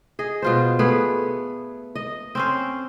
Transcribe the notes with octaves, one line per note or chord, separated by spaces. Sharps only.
G#4 D#5
B2 F4 C5
A3 B3 G#4
D#5
C4 C#4 C5